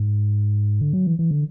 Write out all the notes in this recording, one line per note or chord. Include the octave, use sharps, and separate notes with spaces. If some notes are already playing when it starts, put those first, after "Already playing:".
Already playing: G#2
D3
F#3
E3
E3
D3